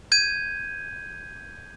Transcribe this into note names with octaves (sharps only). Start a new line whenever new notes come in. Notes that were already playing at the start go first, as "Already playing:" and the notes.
G6 G#6 D#7